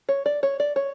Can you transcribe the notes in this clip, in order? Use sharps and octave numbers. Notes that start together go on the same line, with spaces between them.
C#5
D5
C#5
D5
C#5